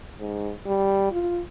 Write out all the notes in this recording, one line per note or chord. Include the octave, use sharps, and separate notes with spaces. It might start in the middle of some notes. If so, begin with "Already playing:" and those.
G#2
G3
F4